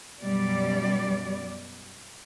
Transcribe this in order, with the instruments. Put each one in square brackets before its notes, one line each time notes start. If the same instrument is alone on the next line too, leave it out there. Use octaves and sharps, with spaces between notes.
[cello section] F#2 B2 G3 D5